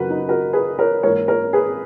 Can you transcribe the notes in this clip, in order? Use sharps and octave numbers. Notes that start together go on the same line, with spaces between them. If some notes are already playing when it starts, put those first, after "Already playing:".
Already playing: F#2 C#3 F#4 A#4 B4
D#4
F#4 A#4
G#4 B4
A#4 C#5
G#2 E3 A#3 A#4 C#5
A#4 C#5
G#4 B4